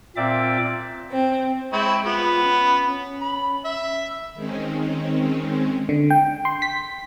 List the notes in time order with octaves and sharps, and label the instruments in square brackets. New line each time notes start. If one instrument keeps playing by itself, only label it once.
[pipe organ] A#2 C4 D5 E5 D6
[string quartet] C4
[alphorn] G#3 [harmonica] C4 E4 C#5
[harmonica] B3 [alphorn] F4
[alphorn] C#4
C#4
[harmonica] B5
E5
[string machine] D#3 G#3 C4 C#4
[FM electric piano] D3
G5
C6
B6